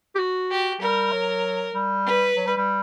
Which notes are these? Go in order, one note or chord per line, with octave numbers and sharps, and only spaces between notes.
G4
F#4
G4
G3 A#4
F#3
G3
B4
F#3
G3
G3